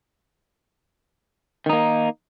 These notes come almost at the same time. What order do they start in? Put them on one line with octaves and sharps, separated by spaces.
D#3 D#4 A#3